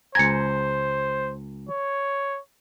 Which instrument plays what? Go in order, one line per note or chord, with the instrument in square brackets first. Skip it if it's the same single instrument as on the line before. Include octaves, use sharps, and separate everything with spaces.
[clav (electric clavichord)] C#2 G#5 A#5 [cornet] C5 [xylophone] G#6 C#7
[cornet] C#5